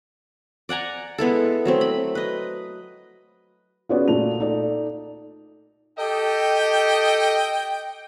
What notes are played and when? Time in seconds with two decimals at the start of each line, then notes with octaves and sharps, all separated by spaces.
0.69 D5 F#5 G#5 A#5
1.18 G#3 B3 E4 A4
1.65 F#3 A3 C4
1.81 B5
2.15 B4 D#5
3.89 B3 C#4 F4 F#4 G#4 D5
4.08 A#2 A3 F7
4.40 D#4 A4 D5
5.99 G4 A4 D#5 G5